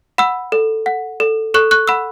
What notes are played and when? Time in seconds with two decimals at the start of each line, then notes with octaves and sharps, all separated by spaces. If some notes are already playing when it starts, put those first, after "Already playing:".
0.18 F#5 B5 E6
0.52 A4
0.86 F#5
1.20 A4
1.54 A4 C#6 F#6
1.71 C#6 F#6
1.87 F#5 B5 E6